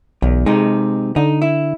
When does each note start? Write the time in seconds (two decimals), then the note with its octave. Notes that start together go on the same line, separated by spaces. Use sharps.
0.22 B1 E2
0.46 C3 G#3 D#4
1.16 D3 D#4
1.42 E4